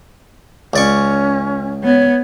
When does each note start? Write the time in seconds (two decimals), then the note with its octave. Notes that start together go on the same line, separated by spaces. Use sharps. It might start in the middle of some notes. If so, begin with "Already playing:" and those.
0.73 C#2 C#4 D5 C#6
1.83 B3 C#5